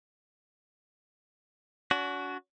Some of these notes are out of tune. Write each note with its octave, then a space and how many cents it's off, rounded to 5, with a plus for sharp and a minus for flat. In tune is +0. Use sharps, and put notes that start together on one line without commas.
D4 -45 F#4 +0